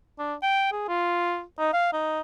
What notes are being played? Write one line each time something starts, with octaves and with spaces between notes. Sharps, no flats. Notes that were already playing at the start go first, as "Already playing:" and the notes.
D4
G5
G#4
F4
D#4
F5
D#4